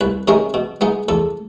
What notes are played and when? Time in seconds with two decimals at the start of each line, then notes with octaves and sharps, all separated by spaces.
0.01 C2 B4
0.28 C3 D#3 G#3 C#4 A#4
0.54 B2
0.81 G#3 B3 D#4
1.09 E2 A4